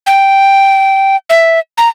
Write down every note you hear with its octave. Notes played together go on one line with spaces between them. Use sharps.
G5
E5
A#5